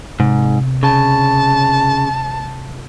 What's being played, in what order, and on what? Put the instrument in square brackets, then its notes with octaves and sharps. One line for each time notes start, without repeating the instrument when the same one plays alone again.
[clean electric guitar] G#2 [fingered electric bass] C3
[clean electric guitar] C#3 [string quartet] A5